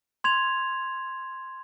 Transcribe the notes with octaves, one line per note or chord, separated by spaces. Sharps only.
C6 G#6 F7